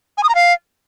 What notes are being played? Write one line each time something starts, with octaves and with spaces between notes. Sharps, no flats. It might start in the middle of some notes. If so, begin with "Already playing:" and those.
G#5
D#6
A#5
F5